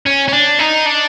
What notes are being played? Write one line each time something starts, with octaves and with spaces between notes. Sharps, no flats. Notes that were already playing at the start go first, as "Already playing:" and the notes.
C#4
C#4
D4
D#4
D4